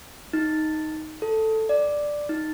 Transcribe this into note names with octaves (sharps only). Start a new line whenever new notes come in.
D#4
A4
D5
D#4